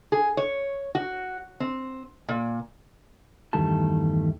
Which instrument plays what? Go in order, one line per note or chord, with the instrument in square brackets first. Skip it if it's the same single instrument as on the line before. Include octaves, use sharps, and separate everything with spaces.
[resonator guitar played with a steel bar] G#4
C#5
F#4
C4
A#2
[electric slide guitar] E2 G2 D#3 G3 A3 A5